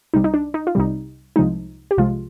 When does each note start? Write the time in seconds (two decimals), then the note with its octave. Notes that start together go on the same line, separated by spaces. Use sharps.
0.14 C2 C3 G3 D#4
0.24 D#4
0.34 D4
0.54 D#4
0.67 F4
0.75 C2 C3 G3 D#4
1.36 C2 C3 F3 G#3 D#4
1.91 G4
1.97 C2 C3 F3 G#3 F4